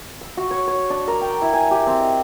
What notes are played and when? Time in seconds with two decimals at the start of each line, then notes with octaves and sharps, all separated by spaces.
0.21 E6
0.37 F#4
0.51 C#5
0.68 C#5
0.90 D4
1.08 A#4
1.21 G5
1.42 E4
1.53 G#5
1.71 G4
1.87 C4
2.00 D#5